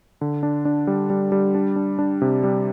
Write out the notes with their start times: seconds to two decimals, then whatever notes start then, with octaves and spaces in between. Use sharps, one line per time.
0.21 D3
0.43 D4
0.65 D4
0.87 G3
1.10 G3
1.32 G3
1.55 D4
1.76 D4
1.99 D4
2.22 C3
2.43 G3